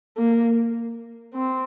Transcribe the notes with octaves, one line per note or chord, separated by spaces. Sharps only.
A#3
C4